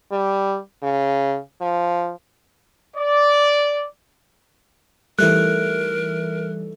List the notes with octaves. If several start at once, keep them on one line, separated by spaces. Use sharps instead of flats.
G3
C#3
F3
D5
E3 G3 A3 D#4 E4 A#4 F#6